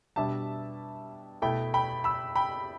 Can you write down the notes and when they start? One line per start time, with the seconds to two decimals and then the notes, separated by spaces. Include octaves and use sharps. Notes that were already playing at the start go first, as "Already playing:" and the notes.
0.16 B2 G3 D4 E5 A5
1.42 B2 A3 E4 G5 B5
1.74 G5 B5
2.04 B5 E6
2.36 G5 B5